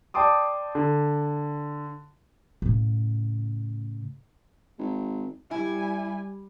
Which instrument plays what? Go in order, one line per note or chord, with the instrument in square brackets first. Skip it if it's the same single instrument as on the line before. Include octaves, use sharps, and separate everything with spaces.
[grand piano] D5 G5 A5 C6 D6 D#6
D3
[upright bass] A2 C#3
[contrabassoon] G#1
[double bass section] G3 [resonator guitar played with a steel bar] E4 [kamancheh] G#5